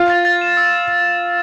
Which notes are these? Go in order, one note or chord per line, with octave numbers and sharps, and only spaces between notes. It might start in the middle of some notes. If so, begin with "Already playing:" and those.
Already playing: F4
A6
A6
E7
E6